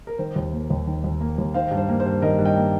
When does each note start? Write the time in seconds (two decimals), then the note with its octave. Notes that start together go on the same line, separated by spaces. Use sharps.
0.07 A#4
0.18 D#3 C5
0.36 D#2
0.53 A#3
0.70 D#2
0.87 D#3
1.04 D#2
1.21 A#3
1.38 D#2
1.54 D#3 C5 F5
1.71 G2
1.77 C5
1.89 A#3
2.00 C5
2.06 G2
2.22 D#3 A#4 D#5
2.39 G2
2.45 D#5 G5
2.56 A#3